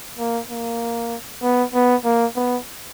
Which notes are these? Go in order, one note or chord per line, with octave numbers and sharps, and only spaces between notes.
A#3
A#3
B3
B3
A#3
B3